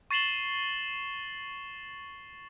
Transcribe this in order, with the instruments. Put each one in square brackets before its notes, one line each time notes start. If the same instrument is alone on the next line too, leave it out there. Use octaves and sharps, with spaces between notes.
[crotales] C#6 A6 C7 E7 F#7 G7